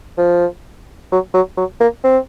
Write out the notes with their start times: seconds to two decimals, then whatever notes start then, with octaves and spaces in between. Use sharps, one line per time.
0.18 F3
1.12 F#3
1.34 F#3
1.57 F#3
1.80 A#3
2.04 C4